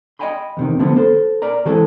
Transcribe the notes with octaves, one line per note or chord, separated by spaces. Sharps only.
D#5 E5 G5 G#5 B5 C6
E2 C3 D#3
D3 F3 A3 B3 C4
A4 C5
A#4 D5 A#5
C#3 E3 G#3 C4 G#4 A4